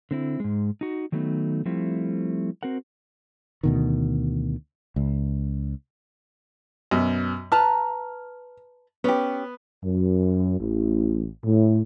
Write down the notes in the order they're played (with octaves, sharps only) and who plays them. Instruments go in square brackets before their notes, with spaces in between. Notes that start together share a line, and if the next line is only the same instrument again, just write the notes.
[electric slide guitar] D3 C4 E4
G#2 G#3
D#4 F#4
D#3 F#3 A3 B3 D#4
F3 G3 A3 C4 E4
C4 F#4 A#4 F#5
[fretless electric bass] D2 B2 D#3
C#2
[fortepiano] F#2 B2
[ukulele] B4 A5 A#5 [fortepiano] F6
[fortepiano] B3 [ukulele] C#4 G4
[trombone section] F#2
A1
A2